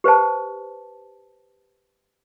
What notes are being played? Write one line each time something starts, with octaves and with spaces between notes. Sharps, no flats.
G4 B4 C5 A5